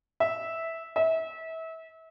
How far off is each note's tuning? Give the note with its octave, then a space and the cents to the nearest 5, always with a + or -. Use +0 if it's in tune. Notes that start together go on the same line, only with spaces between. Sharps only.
E5 -10
E5 -30